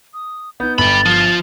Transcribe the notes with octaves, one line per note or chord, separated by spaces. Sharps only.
D#6
B3 D#4 G6
G1 G5 B5 A6
F3 F4